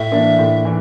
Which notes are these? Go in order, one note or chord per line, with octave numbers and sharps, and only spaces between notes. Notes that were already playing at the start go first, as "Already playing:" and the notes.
Already playing: A2 E5
E3 A#3 D4
A2
E3